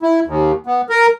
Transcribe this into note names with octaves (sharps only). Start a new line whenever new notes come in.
E4
D#2
B3
A#4